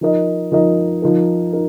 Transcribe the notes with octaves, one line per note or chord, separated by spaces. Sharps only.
F3 D#4 A#4 D#5
F3 D#4 A#4 D#5
F3 D#4 A#4
D#4 A#4